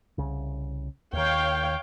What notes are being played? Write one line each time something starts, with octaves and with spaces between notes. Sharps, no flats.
C2 C#3
D#2 D#3 C#5 F5 G5